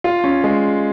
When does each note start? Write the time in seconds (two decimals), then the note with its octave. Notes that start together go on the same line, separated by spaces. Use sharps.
0.04 F4
0.24 C#4
0.44 G#3